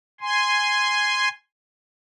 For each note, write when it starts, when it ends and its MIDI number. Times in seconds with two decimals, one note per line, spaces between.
0.21 1.29 80
0.21 1.29 84